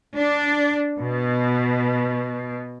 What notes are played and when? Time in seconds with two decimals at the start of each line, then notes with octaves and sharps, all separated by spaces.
0.17 D4
0.99 B2